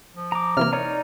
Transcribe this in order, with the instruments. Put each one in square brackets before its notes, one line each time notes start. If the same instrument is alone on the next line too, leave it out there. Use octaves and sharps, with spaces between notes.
[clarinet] F3
[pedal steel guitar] A#5 D6
[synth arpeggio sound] C3 E3 A#3 [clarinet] F6
[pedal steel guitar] D#4 D5 A#5 [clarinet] C#5